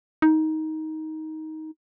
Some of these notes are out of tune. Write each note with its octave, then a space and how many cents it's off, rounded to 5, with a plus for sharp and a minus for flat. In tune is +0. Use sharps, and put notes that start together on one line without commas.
D#4 +15